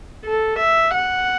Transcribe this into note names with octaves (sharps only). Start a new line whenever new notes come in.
A4
E5
F#5